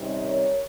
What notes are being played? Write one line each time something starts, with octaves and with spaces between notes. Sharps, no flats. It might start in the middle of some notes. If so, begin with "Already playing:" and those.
Already playing: C3 D#3 G3 C#4
A#4 C#5